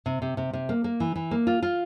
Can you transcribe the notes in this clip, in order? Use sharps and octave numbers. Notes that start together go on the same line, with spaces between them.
C3
C3
C3
C3
A#3
A#3
E3
E3
A#3
F4
F4